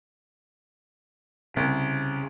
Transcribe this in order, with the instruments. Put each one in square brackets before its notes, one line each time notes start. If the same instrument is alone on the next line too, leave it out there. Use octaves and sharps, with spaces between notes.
[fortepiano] C2 [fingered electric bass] C#3